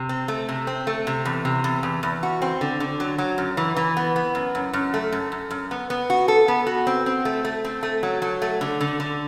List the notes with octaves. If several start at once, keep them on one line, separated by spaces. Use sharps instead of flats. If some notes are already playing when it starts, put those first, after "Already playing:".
Already playing: C3
C4
A3
C3
C4
A3
C3
E2
C3
E2
E2
E2
F#4
C4
D3
D3
F#3
F#3
F#2
E3
E3
B3
B3
F#2
F#2
F#2
A3
F#2
F#2
F#2
B3
B3
F#4
A4
B3
F#4
C4
C4
A3
A3
C4
A3
F#3
F#3
A3
D3
D3
D3